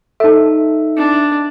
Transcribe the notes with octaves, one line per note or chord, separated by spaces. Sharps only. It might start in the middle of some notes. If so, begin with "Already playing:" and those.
D#4 A4 E5 A5
D4